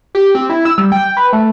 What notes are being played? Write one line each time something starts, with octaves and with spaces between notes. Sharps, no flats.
G4
C4
E4
E6
G3
G5
B4
A3